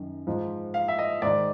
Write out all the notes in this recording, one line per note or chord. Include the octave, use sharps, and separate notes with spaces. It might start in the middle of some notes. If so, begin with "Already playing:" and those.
Already playing: F#2 D#3
G#2 F3
F5
E5
D#5
G#2 D#3 D5